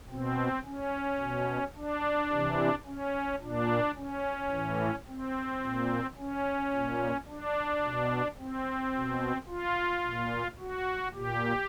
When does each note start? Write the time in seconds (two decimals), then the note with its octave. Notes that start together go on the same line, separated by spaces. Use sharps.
0.09 B2 C4
0.65 C#4
1.19 B2
1.75 D4
2.31 C3 E3
2.86 C#4
3.41 A#2 D4
3.96 C#4
4.51 A2 E3
5.07 C4
5.61 A#2
6.18 C#4
6.72 A#2
7.28 D4
7.83 B2
8.38 C4
8.93 B2
9.48 F4
10.04 A#2
10.59 F#4
11.14 A#2 G4